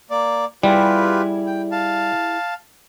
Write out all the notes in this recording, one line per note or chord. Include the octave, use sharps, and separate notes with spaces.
A#3 D5
G3 E4 F4 G4 G#4 B4
G5
F5 A5